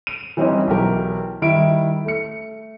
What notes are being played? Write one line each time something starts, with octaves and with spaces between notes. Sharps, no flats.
D#7
E3 G3 C4 C#4 D#4 E4
B1 E3 G4 A#4
D#3 G3 E4 D7
A3 C#7